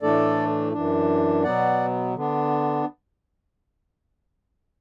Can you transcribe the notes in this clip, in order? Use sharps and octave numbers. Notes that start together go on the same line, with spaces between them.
A2 E3 A3 D4 A4 D5
F#2 E3 D4
B2 F#3 B3 D5 F#5
D3 B3 D4